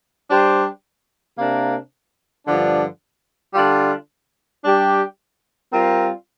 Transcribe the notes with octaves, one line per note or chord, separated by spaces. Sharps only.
G3 D4 G4 C5
C3 A#3 D4 A#4
G2 D3 F3 D4
D3 G3 D4 F4
G3 D4 G4
G3 C4 F4 A#4